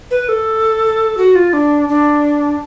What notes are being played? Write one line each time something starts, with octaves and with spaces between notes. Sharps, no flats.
B4
A4
F#4
F4
D4
D4